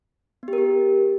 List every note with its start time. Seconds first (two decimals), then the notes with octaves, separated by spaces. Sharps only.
0.43 B3
0.48 G4
0.53 A#4
0.58 G4